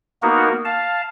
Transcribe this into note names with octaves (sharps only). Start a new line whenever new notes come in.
A#3 B3 D#4 F#4 A#4
F5 A5